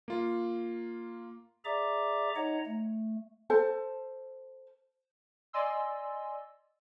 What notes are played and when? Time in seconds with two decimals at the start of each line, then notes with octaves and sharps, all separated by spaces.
0.08 A#3 F4
1.65 G#4 D5 E5 A#5 D6
2.36 D#4 C#5 D#5 F#5 A#5
2.66 A3
3.50 A4 C5 A5
5.53 D5 D#5 G#5 C6 E6